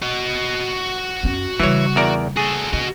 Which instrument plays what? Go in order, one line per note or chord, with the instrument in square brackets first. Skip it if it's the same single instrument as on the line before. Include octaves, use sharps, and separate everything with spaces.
[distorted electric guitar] F#4 D#5
[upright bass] F#2 C#4
[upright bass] C#3 G3 [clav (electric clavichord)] E3 C#5
[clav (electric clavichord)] E2 A#4 D5
[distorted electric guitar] F#4 A4 [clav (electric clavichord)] G#4
[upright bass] D4 [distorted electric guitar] F#4 D#5